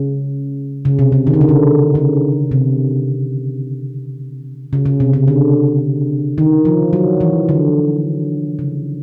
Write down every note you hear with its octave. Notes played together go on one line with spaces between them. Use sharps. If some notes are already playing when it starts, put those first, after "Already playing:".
Already playing: C#3
C#3
C3
C#3
D#3
D3
C#3
D3
C#3
C3
C#3
C#3
C3
C#3
D3
D#3
F3
F#3
E3
D3
C#3